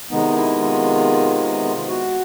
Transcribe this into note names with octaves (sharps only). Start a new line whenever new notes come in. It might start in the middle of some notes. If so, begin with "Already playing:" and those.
C3 D#3 G#3 B3 D#4
E4
F4
F4
F#4